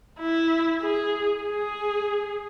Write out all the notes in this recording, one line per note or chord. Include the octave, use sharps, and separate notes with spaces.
E4
G#4
G#4